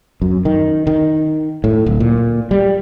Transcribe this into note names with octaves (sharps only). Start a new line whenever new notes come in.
F#2
D#3
D#3
A2
D1
A#2
G3